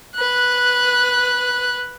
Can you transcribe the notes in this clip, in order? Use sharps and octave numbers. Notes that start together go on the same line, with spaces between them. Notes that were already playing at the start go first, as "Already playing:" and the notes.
B4 F#6